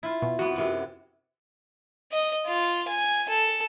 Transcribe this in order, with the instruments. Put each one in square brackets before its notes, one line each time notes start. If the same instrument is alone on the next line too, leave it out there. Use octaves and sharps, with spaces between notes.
[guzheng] E4 F4
[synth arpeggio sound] B2
[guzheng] F2 B3 [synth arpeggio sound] F#4
[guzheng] F#2 C3
[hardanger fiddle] D#5
F4
G#5
A4